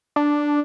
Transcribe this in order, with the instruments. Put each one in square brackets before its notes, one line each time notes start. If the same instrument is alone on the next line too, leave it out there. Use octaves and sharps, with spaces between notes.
[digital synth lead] D4